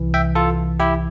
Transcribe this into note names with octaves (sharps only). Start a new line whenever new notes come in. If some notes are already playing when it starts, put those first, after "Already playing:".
Already playing: C2 C3 E3
E5 G5
F4 A4
E4 G4